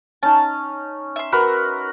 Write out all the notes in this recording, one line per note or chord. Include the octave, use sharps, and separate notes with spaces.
C#4 D#4 A5
E5 C6
F#4 A#4 B4